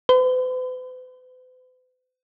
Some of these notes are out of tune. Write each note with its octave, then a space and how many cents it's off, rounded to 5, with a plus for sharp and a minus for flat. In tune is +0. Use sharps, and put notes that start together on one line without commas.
B4 +45